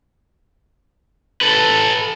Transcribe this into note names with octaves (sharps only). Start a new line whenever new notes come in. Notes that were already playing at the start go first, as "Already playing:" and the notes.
A4 B4